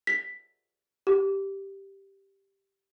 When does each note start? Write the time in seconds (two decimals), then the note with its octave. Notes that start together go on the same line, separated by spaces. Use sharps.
0.07 B6
1.07 G4